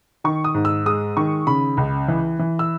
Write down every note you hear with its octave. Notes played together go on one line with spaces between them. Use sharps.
D#3 C#6
D#6
G#2
E6
G#3 D#6
D#3 C#6
C#3 B5
C#2
E3
E3
E6